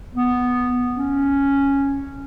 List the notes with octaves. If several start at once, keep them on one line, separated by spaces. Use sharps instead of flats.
B3
C#4